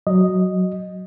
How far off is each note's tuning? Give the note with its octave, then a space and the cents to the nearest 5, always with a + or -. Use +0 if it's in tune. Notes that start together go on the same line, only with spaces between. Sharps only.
F#3 +0 D#5 +0